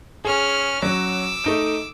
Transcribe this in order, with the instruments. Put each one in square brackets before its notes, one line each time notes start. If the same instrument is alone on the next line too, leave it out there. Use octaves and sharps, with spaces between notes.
[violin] C#4 F6 [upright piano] G#4
[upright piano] F#3 C#4 F#4 [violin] D6 E6
[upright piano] A3 D#4 D7